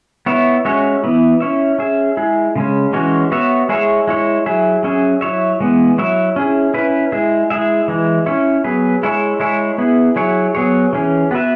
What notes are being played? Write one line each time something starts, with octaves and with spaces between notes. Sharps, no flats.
B3 E4 C#5 E5
G#3 C#4 F#4 C#5 E5
E3 B3 E4
C#4 E4 C#5 E5
C#4 G#4 E5
G#3 E4 G#4
C#3 G#3 C#4
E3 G#3 C#4 F#4 C#5
B3 F#4 C#5 E5
G#3 E4 G#4 C#5 E5
G#3 E4 C#5
F#3 E4 G#4 E5
F#3 C#4 G#4 E5
F#3 E4 C#5 E5
E3 G#3 B3
F#3 E4 C#5 E5
C#4 E4 G#4
C#4 E4 B4
G#3 E4 G#4
G#3 E4 G#4 E5
E3 G#3 E4
C#4 E4 C#5
F#3 B3 G#4 B4
G#3 E4 G#4 C#5 E5
G#3 E4 G#4 C#5 E5
B3 E4 G#4
F#3 E4 G#4 C#5
F#3 B3 G#4 C#5
E3 C#4 G#4
B3 F#4 B4 E5